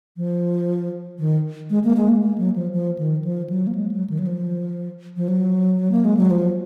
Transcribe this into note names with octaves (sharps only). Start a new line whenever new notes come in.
F3
D#3
G#3
A#3
G#3
A#3
A#3
F#3
F3
F3
D#3
F3
F#3
A#3
G#3
F#3
D#3
F#3
F3
F3
F#3
A#3
G#3
F#3
F3